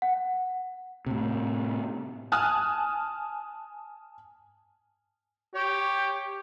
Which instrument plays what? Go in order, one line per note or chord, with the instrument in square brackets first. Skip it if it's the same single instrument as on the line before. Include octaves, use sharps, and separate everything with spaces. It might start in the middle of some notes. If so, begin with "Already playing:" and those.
[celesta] F#5
[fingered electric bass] A2 C3
[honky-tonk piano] G#5 A5 D#6 F6 F#6
[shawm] G4 [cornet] C#5